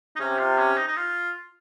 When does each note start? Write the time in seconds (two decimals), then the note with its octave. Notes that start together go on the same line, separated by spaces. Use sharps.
0.16 D#4
0.20 C3 C#4
0.39 F4
0.58 C#4
0.77 D#4
0.87 D#4
0.97 F4